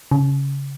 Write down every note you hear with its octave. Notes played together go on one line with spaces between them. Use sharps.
C#3